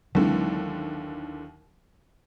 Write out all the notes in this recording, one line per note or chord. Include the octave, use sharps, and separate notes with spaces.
D#2 D3 E3 F#3 G#3 C4